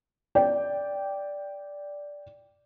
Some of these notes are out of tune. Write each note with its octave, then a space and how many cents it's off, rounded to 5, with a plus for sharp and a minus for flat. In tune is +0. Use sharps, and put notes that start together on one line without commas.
D5 -10 G5 +0